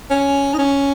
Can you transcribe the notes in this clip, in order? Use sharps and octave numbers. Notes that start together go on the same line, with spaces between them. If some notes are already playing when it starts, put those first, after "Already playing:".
C#4
D#4
C#4